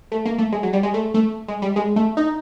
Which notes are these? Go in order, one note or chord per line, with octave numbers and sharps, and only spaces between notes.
A3
A#3
A3
G#3
F#3
G3
G#3
A3
A3
G#3
G3
G#3
A3
D#4